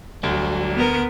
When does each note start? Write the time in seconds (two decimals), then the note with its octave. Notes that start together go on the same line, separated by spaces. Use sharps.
0.23 D2 F#3 G3
0.76 B3 A#4